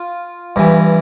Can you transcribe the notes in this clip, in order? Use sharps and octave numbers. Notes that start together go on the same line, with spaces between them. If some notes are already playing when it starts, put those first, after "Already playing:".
Already playing: F4
G2 E3